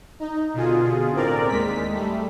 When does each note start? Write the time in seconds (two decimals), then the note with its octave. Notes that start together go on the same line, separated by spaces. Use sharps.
0.20 D#4
0.54 B2 D3 F4 G#4
1.13 A2 C4 A#4 D5
1.48 D#2 G#3 B6
1.91 G3 A3